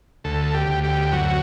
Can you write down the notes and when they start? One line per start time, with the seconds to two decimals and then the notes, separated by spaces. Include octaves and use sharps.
0.24 D2 A4
0.54 G4
0.68 D2
0.84 G4
1.12 F#2 F#4